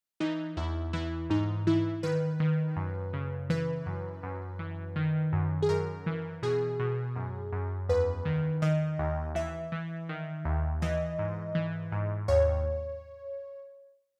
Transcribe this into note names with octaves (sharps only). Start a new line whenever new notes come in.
E3 D#4
E2 E4
E3 E4
G#2 D#4
E3 E4
D#3 B4
D#3
F#2
C#3
E3 B4
F#2
F#2
E3
D#3
F#2
G#4
F#2 A#4
E3
B2 G#4
B2
F#2
F#2
E2 B4
D#3
D#3 D#5
D#2
E3 E5
E3
D#3
D#2
E3 D#5
G#2
E3
G#2
D#2 C#5